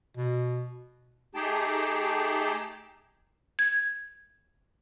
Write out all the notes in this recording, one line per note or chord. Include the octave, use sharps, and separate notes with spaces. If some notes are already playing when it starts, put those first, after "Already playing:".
B2
A3 D#4 G4 G#4 G5 A5
G#6